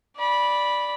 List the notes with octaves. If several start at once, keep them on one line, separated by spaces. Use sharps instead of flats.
D5 B5